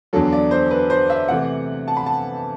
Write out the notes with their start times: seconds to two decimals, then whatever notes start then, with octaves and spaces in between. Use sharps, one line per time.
0.13 E2 D3 F#3 A4
0.33 D5
0.51 C5
0.71 B4
0.90 C5
1.10 E5
1.28 C3 E3 A3 F#5
1.88 A5
1.97 B5
2.06 A5